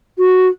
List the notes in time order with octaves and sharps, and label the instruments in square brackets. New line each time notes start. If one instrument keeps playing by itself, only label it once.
[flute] F#4